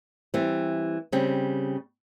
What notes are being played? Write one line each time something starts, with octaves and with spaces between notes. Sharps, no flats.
E3 G3 C4
C#3 G3 C4